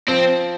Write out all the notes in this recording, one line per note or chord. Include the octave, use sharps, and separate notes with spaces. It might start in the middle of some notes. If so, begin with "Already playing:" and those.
F3 C4